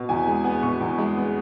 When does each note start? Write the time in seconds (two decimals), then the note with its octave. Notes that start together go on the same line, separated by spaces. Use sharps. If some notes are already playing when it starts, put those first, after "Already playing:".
Already playing: B2
0.09 E2 G#5
0.27 G#3 G#5
0.44 B3 G#5
0.62 B2 C#6
0.80 E2
0.98 G#3
1.17 B3